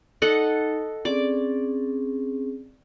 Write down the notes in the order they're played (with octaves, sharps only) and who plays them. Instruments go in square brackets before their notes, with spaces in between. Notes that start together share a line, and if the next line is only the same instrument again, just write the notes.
[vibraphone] D#4 [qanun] A4 D#5 F#5
[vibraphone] C4 C#4 G#4 [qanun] D5 D6